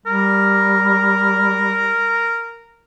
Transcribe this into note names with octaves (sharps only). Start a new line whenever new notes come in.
G3 A#4